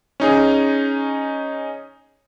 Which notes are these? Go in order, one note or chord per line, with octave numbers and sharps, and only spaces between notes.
C#4 D#4 G#4